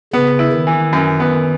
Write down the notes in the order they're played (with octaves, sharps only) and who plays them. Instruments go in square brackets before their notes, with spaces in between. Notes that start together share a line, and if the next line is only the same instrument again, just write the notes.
[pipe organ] C#3 [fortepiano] B3
[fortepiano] E4
[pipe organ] D#3
[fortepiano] E3
F#2
B3